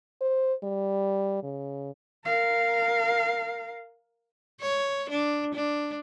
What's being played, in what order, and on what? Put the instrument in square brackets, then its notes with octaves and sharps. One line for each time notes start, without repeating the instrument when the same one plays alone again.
[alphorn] C5
G3
C#3
[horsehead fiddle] A#4 F5
[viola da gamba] C#5
D4
D4